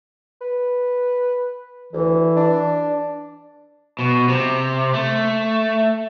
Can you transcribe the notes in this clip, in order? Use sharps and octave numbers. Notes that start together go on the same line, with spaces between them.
B4
D2 E3
D4
B2
C3
A3